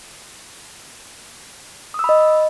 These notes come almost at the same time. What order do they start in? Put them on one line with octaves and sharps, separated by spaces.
D#6 E6 B5 D#5